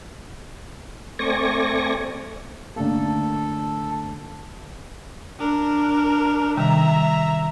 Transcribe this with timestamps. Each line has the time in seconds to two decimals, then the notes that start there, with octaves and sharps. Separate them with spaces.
1.19 A3 C4 D5 G#5 C#6 A#6
2.76 D3 A3 A#3 A4
5.39 D4 A#4
6.57 C3 D#3 G3 E5 A#5